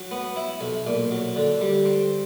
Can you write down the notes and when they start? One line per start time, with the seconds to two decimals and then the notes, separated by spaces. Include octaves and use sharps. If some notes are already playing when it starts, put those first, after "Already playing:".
Already playing: F#3
0.11 B3
0.36 E4
0.61 B1
0.87 A#2
1.11 F#3
1.36 D3
1.61 G3
1.86 C4